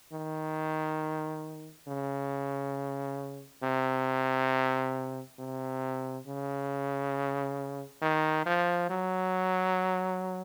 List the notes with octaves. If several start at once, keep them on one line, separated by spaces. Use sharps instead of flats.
D#3
C#3
C3
C3
C#3
D#3
F3
F#3